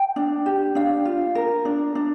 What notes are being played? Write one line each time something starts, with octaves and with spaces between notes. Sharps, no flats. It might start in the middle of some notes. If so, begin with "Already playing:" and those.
Already playing: G5
D4
G4
D4 F5
F4
A#4
D4
D4